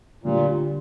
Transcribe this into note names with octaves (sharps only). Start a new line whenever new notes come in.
A#2 D3 G3